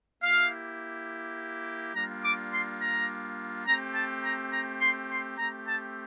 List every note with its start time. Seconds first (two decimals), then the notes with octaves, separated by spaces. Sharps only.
0.22 A#3 E4 G4 F5
1.94 G3 A#3 D4 F4 A#5
2.23 D6
2.52 C6
2.80 A#5
3.67 A3 C4 G4 A#5
3.95 A5
4.24 A#5
4.52 A#5
4.81 C6
5.10 C6
5.39 A3 C4 G4 A#5
5.67 A5